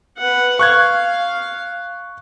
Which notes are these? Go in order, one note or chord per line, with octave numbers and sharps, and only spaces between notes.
B4 F#5
F5 C#6 F#6 G#6